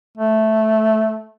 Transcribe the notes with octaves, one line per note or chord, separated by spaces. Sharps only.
A3